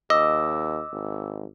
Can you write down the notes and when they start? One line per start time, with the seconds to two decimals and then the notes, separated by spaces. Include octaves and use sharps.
0.10 D#2 D#5 D6 E6
0.92 G#1